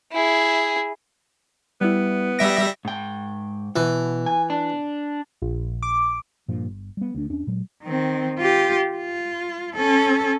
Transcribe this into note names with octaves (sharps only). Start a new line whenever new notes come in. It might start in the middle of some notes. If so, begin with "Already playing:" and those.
E4 G#4
G3 B3 E4
G3 E5 A#6 D7
G#2 G5
B2 E3
G#5
D4
A#1
D6
G2 A#2 F3
G1
G3 B3
D2 A3 D4
E2 C#4 D4
A#2 F#3 G#3
D#3 C4
F4 G4
F4
C#4 A4